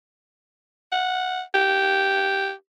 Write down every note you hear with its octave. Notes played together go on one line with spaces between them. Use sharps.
F#5
G4